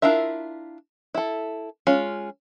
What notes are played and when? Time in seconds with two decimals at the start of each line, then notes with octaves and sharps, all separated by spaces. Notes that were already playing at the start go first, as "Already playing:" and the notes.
0.02 D4 E4 F4 A#4 E5
1.14 E4 A4
1.87 G#3 C#4 F4